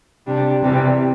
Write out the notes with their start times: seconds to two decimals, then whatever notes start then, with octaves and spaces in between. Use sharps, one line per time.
0.27 C3 G3 D4
0.63 C3 E3 G3 C4